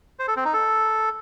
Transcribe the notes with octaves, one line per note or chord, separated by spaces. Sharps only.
C5
A4
C4
D#4
A4